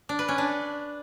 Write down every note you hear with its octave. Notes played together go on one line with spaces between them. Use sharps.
D4
B4
C#4
D4